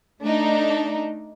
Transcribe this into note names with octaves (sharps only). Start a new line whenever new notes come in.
A3 D4 D#4